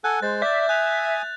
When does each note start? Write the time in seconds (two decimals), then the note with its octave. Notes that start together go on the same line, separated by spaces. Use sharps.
0.04 A4 F#5 G#5 F#6
0.22 G#3 C5 A6
0.42 D5 E5 G6 A6
0.69 G#5 D#6 F#6 F7